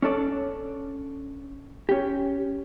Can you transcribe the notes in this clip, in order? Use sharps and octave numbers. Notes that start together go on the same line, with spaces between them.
C#4 D4 A4 D5
C#4 G4